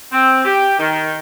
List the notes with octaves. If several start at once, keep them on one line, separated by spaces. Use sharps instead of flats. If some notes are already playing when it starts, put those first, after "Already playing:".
C4
G4
D#3